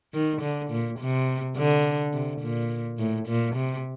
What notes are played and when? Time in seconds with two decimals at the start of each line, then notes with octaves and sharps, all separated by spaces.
0.13 D#3
0.42 D3
0.70 A#2
1.00 C3
1.56 D3
2.13 C3
2.41 A#2
2.98 A2
3.28 A#2
3.56 C3